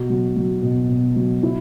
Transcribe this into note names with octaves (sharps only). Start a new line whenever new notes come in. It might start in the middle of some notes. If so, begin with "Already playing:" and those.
Already playing: B2 F#4
F#3
F#3
B2
B2
F#3
E4